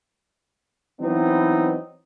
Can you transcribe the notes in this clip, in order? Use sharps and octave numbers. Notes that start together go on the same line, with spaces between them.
E3 F#3 B3 C4 D#4